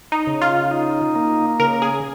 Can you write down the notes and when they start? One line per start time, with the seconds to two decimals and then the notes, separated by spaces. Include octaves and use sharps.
0.12 D#4
0.27 C#3
0.41 F4
0.71 D#4
1.15 A#3
1.60 C#3 A#4
1.82 G#4